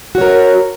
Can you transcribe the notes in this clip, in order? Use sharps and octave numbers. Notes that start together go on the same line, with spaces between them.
F#4 A#4 C#5